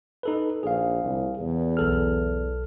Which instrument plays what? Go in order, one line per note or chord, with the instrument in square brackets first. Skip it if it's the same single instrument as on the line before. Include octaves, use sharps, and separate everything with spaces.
[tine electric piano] D#4 A4 B4
[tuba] A#1 [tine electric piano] G#4 F5
[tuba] C2
E2
[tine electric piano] B1 A4 F6